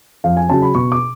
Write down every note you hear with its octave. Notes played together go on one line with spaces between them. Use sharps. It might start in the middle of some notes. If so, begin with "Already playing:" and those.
F2 F5
G#5
C#3 F#3 C#4 A5
B5
B2 C#6
D6